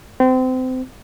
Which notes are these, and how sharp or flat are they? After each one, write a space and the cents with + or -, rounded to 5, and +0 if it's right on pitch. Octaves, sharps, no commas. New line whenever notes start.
C4 -30